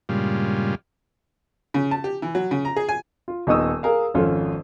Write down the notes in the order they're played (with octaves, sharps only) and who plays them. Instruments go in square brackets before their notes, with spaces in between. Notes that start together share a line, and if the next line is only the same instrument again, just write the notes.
[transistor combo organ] G2 A#2 C#3 G3 G#3 F4
[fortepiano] C#3
A5
G4
E3
F#3
C#3
A#5
G#4
G#5
[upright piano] F4
D#1 B3 D#4 C#6 D#6 E6
G#4 A#4 F5
G#1 F2 C#4 F4 A4